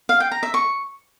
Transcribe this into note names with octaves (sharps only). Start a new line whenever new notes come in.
F5
G5
A#5
E5
C#6